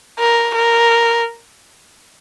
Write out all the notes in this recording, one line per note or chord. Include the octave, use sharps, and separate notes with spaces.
A#4
A#4